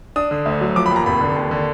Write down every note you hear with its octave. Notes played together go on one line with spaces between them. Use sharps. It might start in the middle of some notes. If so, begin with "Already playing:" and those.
D4 D#6
D3
D2
F#3
F3 D6
B5
D#2 A#5
F1 B5
D3
D#2
D3